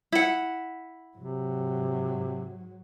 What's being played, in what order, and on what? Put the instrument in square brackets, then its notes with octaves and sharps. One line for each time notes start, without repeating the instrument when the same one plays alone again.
[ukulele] E4 F#5
[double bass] G#2 F#3 [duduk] C3